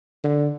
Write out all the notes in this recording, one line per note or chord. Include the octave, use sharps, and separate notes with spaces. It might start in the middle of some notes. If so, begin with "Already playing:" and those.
D3